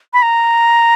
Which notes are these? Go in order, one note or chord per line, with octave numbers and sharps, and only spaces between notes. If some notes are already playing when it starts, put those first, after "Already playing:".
B5
A#5